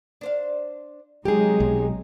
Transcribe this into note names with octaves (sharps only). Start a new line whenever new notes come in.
D4 C5 F5
C3 F#3 G#3 D#4 G4 G#4
B1